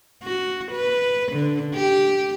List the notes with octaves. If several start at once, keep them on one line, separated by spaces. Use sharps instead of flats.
F#4
B4
D3
G4